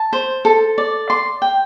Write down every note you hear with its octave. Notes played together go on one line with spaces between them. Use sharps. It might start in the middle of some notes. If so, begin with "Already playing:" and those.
Already playing: A5
C5
A4
D5
C6
G5